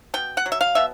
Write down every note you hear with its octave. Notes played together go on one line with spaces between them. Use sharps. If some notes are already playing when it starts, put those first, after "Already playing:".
B2 G5
F#5
F#3
E5
F5
B2 E5